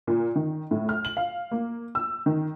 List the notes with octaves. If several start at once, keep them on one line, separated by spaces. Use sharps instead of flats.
A#2
D#3
A2
F6
F#7
F5
A#3
E6
D#3